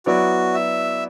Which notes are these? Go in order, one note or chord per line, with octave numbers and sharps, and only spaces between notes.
F#3 B3 E4 F#4 D5
E5